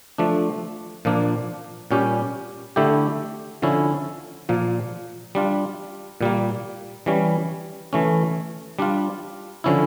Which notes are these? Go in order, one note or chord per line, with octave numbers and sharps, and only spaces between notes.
F3 A3 D4
A#2 F3 A#3 D4
A#2 G3 C#4 G4
D3 A3 E4 G4
D3 F3 C#4 E4
A#2 F3 A#3
G3 D4 F4
A#2 G3 A#3
E3 G3 C#4
E3 A3 C#4
G3 D4 F4
D3 F3 C#4 E4